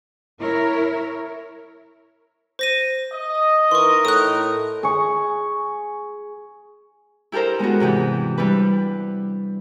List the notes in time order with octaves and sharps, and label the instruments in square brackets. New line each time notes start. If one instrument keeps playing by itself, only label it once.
[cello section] E4 A#4 C#5
[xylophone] C5 A#6 D#7
[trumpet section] D#5
[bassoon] E3 [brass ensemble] D#4 A#4 [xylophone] C6 C#6
[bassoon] A2 [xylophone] D#6 F#6
[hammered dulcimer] G#4 C#6
[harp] E4 G4 A4 A#4 C5
G#3 B3 D4 F#4
G#2 C3 E3 G4
G3 D4 E4 G4 B4